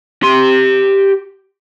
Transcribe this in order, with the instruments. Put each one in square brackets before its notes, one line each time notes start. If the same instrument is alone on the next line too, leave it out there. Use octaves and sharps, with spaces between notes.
[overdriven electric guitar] G4 C6